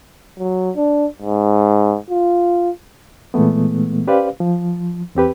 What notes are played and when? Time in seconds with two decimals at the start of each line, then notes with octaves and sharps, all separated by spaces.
0.39 F#3
0.76 D4
1.22 G#2
2.10 F4
3.34 A#2 E3 G#3 A3 B3
4.07 C#4 G4 B4 C5 D5 F5
4.40 F3
5.15 E2 C4 G4 B4